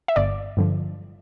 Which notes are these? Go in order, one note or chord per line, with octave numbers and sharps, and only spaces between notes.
E5
G1 D5
G2 D3 F3